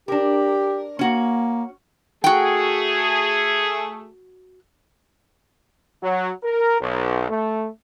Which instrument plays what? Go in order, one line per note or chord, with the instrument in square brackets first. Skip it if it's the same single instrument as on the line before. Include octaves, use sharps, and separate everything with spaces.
[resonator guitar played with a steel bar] D4 A#4 [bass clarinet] G4
[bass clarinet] A#3 [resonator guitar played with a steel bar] C#4 F#4
[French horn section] A3 G#4 [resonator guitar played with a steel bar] F#4 G5
[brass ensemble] F#3
A#4
B1
A3